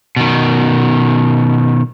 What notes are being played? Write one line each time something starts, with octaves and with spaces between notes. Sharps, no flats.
B2 D#3